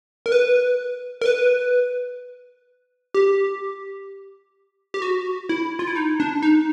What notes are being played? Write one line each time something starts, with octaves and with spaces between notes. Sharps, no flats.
A#4
B4
A#4
B4
G4
G4
F#4
E4
F4
E4
D#4
D4
D#4